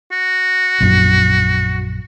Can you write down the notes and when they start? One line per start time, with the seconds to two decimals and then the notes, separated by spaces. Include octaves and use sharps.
0.12 F#4
0.80 A#1 F#2